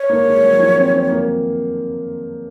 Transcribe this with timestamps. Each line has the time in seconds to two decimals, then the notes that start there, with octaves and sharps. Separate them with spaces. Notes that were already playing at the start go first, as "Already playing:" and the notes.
Already playing: C#5
0.09 A#3
0.26 G#3
0.42 F#3
0.59 F3
0.76 C4
0.92 C4
1.09 A#3